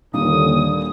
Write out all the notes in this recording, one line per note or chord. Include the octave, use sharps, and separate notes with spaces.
D#2 A#2 D3 D#3 G3 D#6